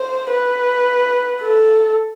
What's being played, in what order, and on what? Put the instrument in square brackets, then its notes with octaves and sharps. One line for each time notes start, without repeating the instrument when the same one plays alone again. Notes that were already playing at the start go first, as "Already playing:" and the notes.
Already playing: [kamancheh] C5
B4
A4